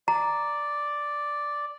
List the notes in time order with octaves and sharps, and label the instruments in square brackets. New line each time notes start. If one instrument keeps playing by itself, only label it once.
[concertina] D5 [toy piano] A#5